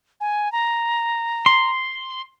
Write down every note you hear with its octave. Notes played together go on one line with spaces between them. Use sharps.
G#5
A#5
C6